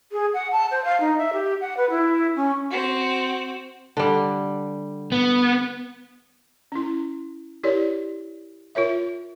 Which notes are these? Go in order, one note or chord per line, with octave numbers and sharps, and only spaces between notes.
G#4
F#5
A5
C5
F5
D#4
E5
G4
F#5
B4
E4
C#4
C4 F#4
D3 G3
B3
C#4 E4
E4 G4 A#4 C#5 D5
F4 A#4 C#5 E5